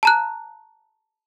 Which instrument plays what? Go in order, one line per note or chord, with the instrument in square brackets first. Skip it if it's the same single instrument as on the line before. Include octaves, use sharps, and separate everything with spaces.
[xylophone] A5 A#5 F#6